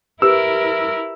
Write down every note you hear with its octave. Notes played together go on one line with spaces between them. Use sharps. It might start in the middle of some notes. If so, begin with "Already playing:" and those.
E4 G4 A#4 B4 E6